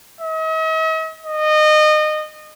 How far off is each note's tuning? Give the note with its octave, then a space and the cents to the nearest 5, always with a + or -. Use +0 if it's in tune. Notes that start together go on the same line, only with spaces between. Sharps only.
D#5 +45
D#5 -25